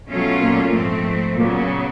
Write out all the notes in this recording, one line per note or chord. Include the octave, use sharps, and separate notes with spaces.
B2 F#3 A3 C#4 F4
A#2 A#3
G#2 F3 A3 C4
A#2 C#3 F#3 A#3 B3